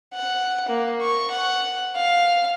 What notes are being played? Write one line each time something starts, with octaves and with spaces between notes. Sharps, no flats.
F#5
A#3
C#6
F#5
F5